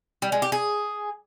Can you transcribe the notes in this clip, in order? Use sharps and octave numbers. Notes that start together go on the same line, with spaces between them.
G3
G#3
G4
G#4